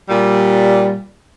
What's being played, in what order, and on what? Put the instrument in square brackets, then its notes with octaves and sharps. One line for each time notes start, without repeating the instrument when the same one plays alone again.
[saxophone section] A#2 G3